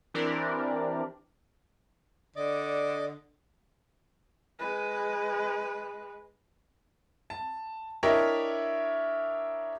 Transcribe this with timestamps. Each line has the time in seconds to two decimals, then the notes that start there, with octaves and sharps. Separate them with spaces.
0.14 E3 C4 D4 G4 A#4 D5
2.36 D3 D5 D#5 D6
4.59 G#3 B4
7.30 A5
8.03 D4 E4 G4 A#4 C#5 D#5